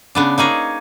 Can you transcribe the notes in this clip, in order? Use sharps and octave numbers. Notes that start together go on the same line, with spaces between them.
C#3 B3 D4
A#3 D#4 G#4 C#5